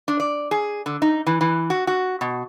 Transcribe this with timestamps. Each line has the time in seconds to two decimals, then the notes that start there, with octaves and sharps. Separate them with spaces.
0.08 D4
0.20 D5
0.51 G#4
0.86 D3
1.02 D#4
1.27 E3
1.41 E3
1.70 F#4
1.87 F#4
2.21 B2